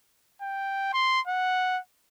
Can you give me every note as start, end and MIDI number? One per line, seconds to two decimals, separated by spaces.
0.42 0.90 79
0.93 1.20 84
1.27 1.79 78